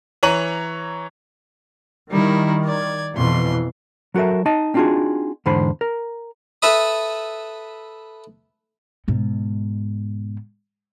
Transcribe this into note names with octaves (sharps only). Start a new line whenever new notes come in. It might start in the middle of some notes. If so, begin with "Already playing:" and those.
E3 C#5 A#5 C#6 D#7 F#7
D#3 G3 D#4 E4
D5 G#6
F2 B2 E3 C6
F#3 F#4 A4 A#4 E5
D#4 D#5 A5
C4 D4 D#4 F4 F#4 G#4
E2 G#2 D3 C5 B5
A#4
A4 B4 E5 B5 D#6
G#2 B2